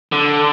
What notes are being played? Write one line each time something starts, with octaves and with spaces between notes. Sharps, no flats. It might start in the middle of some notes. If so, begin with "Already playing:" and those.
D3